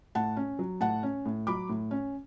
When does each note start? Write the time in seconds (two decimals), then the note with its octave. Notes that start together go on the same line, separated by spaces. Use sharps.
0.15 A2 F#5 A5
0.37 C#4
0.59 F#3
0.81 A2 F#5 A5
1.03 C#4
1.26 A2
1.47 F#3 B5 D6
1.69 A2
1.91 C#4